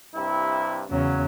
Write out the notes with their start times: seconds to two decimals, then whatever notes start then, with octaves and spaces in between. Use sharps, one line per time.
0.15 G2 C3 E4
0.91 E2 C#3 F#3